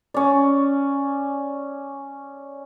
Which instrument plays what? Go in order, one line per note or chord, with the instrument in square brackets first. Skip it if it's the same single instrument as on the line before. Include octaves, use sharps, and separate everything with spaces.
[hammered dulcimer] C#4 D5